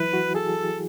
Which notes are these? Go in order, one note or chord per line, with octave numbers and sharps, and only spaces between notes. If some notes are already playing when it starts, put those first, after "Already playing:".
Already playing: E3 F#3 E4 B4
F#4
G#4 A4